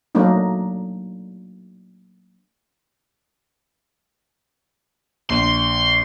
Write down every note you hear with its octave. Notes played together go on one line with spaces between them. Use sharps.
F#3 A3 A#3 D4 D#4
A#1 C6